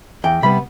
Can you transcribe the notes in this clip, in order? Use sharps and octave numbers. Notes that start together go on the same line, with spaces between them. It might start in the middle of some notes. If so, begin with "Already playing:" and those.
E2 G5
C3 G3 B3 B5